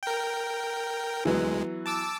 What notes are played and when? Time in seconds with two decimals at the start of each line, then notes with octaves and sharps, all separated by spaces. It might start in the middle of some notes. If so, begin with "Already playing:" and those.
0.03 A#4 G5
1.25 D2 E3 F#3 G#3 B3
1.86 A5 D6 E6